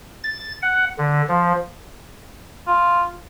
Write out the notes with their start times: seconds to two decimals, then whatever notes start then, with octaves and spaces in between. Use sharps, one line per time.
0.24 A6
0.62 F#5
0.98 D3
1.29 F3
2.67 F4